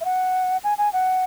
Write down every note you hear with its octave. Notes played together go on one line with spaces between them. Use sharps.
E5
F#5
G#5
G#5
F#5